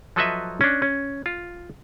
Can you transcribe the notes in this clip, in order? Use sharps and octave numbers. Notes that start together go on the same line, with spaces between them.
F3 F#3 A4 B4 D#5 E5
C#4 D4
C#4
F4